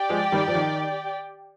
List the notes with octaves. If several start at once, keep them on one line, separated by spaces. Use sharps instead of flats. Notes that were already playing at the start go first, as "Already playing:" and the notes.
Already playing: G4 D5 G5
F3 G#3
D#3 G3
F3
D#3